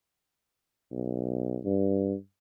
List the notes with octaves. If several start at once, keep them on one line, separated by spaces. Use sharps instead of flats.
B1
G2